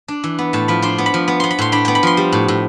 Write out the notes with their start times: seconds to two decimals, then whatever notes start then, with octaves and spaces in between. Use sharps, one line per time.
0.08 D4
0.24 E3
0.39 B3
0.53 A2 A5
0.68 F3 B5
0.82 D4 C6
0.98 B3
1.06 B5
1.14 F3
1.28 B3
1.40 B3 C6
1.51 B5
1.59 A2 C6
1.72 D4 B5
1.85 B3 G5
1.95 B5
2.03 F3 C6
2.17 G3
2.32 A2
2.48 A2